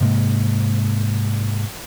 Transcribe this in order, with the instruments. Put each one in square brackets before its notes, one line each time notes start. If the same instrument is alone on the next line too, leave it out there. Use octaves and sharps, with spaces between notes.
[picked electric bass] G#2 C3 G#3 A#3